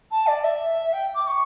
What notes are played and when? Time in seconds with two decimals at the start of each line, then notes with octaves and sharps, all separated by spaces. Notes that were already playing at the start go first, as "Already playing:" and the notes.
0.11 A5
0.26 D5
0.43 E5
0.92 G5
1.14 D6
1.26 C#6